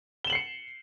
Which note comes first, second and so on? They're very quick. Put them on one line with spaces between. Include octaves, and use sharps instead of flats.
G7 E7 F#7 C7 C#7